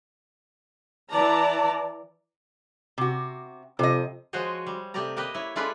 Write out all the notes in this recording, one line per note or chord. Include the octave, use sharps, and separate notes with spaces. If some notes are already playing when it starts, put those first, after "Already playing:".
E3 D5 A5 A#5
C3 F#4
F2 C3 D#5
F3 G#3 F#4 C5 C#5 D#5
G3
C3 A3 G4 D5 D#5 A#5
A#3 G4 B4 D#5 G5
E4 C#5
G#3 E4 F4 A4 B4 D5